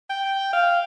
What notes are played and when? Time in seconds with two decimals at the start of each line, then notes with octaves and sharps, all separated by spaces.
0.10 G5
0.53 F5